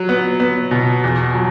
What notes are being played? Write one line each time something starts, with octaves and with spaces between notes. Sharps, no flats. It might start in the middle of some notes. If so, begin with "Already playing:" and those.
Already playing: F#3
B3
B3
B2
E2
F#3